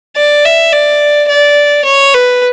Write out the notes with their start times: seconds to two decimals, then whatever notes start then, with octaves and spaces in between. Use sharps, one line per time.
0.17 D5
0.45 E5
0.72 D5
1.29 D5
1.85 C#5
2.14 B4